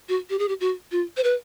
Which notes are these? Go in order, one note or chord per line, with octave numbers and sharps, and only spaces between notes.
F#4
G4
G#4
G4
F#4
F4
C5
B4